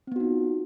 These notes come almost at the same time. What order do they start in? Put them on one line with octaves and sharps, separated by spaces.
C4 B3 F#4 D#4 F4